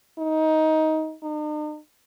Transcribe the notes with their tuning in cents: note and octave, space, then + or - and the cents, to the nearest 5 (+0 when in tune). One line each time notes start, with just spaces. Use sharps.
D#4 +15
D#4 -45